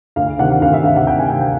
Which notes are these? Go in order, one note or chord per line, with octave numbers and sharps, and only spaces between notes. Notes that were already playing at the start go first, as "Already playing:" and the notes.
D2 F5
C3 D#3 F#5
D2 F5
E5
C3 D#3 F5
F#5
D2 G5
G#5
C3 D#3 G5
G5